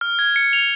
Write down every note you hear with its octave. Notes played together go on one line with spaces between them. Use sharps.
F6
G#6
C#7
F7